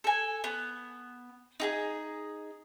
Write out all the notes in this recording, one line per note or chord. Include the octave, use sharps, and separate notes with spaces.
A4 G#5
B3
D#4 G4 G#4